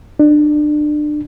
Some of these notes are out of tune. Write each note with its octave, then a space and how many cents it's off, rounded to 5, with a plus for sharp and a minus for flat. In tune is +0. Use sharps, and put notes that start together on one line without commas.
D4 +25